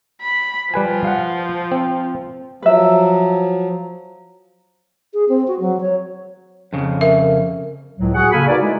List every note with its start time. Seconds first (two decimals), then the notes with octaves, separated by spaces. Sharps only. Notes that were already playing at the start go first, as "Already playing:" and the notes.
0.21 B5
0.74 F3 G3 B4 G#5
1.05 F5 F#5
1.71 C4
2.63 F3 F#3 B4 E5
5.14 G#4
5.29 C4
5.48 F#4
5.60 F#3
5.81 C#5
6.73 F2 C#3
7.01 A#4 E5
7.98 C#2 A2 F#3
8.14 F#4 G#4 F#5
8.32 C#3 A#3 A4 F5 G#5 B5
8.48 D#4 F#4 A#4 B4 D5
8.61 G#3 E4